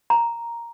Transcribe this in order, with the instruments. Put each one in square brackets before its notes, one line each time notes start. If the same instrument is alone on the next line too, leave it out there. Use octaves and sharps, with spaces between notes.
[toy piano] A#5